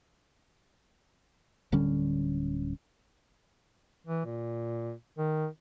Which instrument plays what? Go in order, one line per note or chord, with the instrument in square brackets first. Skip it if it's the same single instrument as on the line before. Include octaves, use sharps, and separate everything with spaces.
[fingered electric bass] D1 D3 G3 C#4
[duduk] E3
A#2
D#3